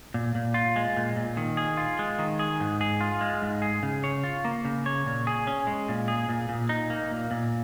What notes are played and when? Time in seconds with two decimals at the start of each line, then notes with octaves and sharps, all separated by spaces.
0.14 A#2
0.35 A#2
0.54 F4
0.76 G#3
0.97 A#2
1.16 A#2
1.37 D#3
1.57 G#4
1.77 F4
1.99 G#3
2.19 D#3
2.39 G#4
2.60 G#2
2.81 G#4
3.01 F4
3.21 G#3
3.42 G#2
3.62 G#4
3.83 C#3
4.04 C#5
4.24 F4
4.45 A#3
4.65 C#3
4.86 C#5
5.07 A#2
5.27 G#4
5.47 C#4
5.67 G#3
5.89 A#2
6.08 G#4
6.29 A#2
6.49 A#2
6.69 D#4
6.90 A#3
7.12 A#2
7.31 A#2